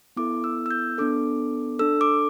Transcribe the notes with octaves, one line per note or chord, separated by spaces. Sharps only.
B3 E4 A4 D6
E6
E6
G6
B3 D4 A4 D6
D4 A4 E6
D6